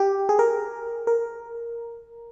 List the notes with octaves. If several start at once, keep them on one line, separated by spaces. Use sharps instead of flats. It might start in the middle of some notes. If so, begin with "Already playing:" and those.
Already playing: G4
G#4
A#4
A#4